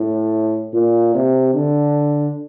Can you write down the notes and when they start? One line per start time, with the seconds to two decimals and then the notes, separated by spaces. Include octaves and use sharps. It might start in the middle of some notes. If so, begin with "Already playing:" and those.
Already playing: A2
0.73 A#2
1.14 C3
1.54 D3